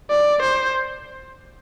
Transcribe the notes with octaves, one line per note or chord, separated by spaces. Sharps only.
D5
C5